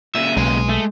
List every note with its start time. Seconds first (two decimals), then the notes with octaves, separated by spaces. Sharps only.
0.15 A#2 C#3 E5 D#7
0.37 B1 G#3
0.69 A3